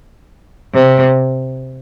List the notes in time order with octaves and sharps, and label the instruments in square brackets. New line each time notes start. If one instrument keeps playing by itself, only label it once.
[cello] C3